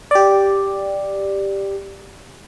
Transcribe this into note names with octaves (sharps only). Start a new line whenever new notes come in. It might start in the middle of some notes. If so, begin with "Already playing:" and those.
G4 D5